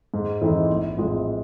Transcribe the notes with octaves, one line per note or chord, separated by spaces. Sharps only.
G#2
E3 A3 C4 D#4
A#1
A2 F3 G#3 C4